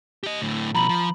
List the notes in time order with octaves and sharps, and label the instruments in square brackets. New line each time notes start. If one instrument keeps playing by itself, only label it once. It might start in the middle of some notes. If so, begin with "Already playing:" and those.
[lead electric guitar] G4 D#5
D2 A2
[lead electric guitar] B2 F3 [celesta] A#5 B5 F#7
[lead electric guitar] F3